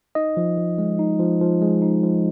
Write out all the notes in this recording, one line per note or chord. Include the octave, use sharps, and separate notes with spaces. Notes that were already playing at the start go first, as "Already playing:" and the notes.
D#4 D#5
F3
F3
G#3
D#4
F3
F3
G#3
D#4
F3